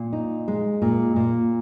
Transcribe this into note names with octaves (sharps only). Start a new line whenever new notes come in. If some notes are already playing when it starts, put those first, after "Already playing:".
Already playing: A#2
D#4
G#3
A#2
A#2